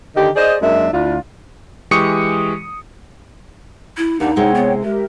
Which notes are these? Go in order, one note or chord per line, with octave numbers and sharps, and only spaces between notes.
D3 D#3 D#4 G4
G#4 C5 D5 D#5
F#2 G#3 A#3 D4 E5
D2 D4 E4 F4
E3 G#3 G4 C#6 D#6 C#7
E4
D#2 D4 D#4 G4 F#5
C3 G#3 E4 C#5 F#5 G5
B3
G#3 G4 A#4 E5